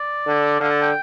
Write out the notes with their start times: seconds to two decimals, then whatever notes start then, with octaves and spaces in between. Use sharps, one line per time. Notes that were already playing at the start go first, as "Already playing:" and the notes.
Already playing: D5
0.26 D3
0.60 D3 F5
0.70 A5
0.82 G5